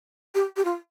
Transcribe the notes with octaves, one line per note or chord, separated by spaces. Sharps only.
G4
G4
F4